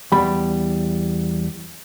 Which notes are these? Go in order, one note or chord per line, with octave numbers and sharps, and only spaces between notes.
E2 G3 B5